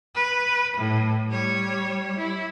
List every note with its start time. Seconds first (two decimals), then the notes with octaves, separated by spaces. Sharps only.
0.15 B4
0.77 A2
1.29 G3 C#5
2.17 E4